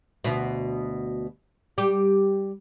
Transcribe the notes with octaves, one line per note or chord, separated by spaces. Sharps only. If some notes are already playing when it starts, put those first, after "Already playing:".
D2 B2
G3 G4